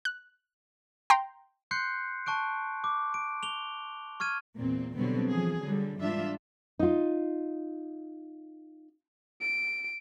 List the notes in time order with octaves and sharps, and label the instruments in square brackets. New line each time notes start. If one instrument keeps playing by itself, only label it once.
[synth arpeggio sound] F#6
G5 A#5 C6
[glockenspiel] C6 F#6 G6 C7 C#7
A5 C#6 F#6 D7
D6
D7
F7 G7
C#6 F6 G#6 D#7
[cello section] E2 A#2 C4
B2 D3 F#3 G3 B3 C4
E3 F3 G#4
D3 F#3 G3
G#2 E3 G3 D4 F4 E5
[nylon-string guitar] D#4 F4
[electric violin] D7